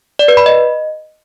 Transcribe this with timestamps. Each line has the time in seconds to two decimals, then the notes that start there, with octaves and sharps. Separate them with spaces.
0.19 D5
0.28 B4
0.37 B5
0.46 D#5